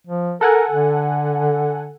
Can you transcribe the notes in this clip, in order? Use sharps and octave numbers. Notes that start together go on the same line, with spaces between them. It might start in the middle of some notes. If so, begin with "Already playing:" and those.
F3
A4 A#4 F#5 G#5
D3